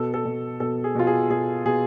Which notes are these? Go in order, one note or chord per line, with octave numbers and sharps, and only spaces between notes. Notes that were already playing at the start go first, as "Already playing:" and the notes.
Already playing: B2 A4
A4
B2
B2 A4
G#4
B2 F4
G#4
B2 G#4
B2 G#4